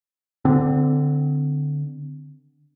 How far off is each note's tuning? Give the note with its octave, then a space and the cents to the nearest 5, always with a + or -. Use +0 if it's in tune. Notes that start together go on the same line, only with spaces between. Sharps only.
D3 +0 C4 -25